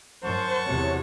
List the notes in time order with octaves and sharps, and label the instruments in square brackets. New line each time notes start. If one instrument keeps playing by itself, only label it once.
[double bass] F#2 [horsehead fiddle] C5 [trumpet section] F#5 A5 C#6
[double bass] E2 C3 [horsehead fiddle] F#4 C#5